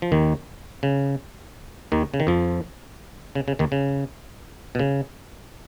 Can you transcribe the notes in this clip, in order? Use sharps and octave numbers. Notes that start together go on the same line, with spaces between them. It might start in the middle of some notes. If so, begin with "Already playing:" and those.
F3
D#2 D#3
C#3
D#2 D#3
C#3
D#3
F2 F3
C#3
C#3
D#2 D#3
C#3
B2
C#3